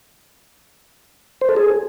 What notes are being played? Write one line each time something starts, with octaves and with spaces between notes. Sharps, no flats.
C5
A4
G#4